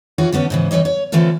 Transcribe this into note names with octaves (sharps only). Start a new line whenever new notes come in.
E3 F4 F#4 G#4 C#5
D3 A3 B3 C#4
G#2 C#3 E3
E3 G3 C#5 D#5
C#5
D3 E3 A3 C4 F4 A4